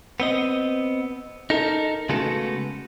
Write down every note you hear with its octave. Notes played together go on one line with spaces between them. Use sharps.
B3 C4 D#5
D#4 A4 A#4
C#3 G#3 A3 B3 F#4 A4